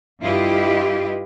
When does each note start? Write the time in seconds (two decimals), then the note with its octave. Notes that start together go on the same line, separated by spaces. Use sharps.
0.21 G2 E4 F4 G4 B4 D#5